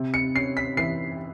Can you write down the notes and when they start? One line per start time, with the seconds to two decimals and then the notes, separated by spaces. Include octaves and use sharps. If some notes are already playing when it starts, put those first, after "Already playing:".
Already playing: C3
0.14 C#7
0.35 C#4 C7
0.57 B6
0.77 E3 C7